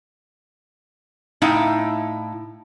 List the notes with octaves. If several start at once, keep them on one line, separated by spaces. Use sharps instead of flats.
A2 D#4 E4 F5 G5